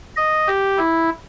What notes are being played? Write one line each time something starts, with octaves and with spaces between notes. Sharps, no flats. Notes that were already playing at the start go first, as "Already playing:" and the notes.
D#5
G4
E4